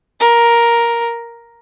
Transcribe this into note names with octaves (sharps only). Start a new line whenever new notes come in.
A#4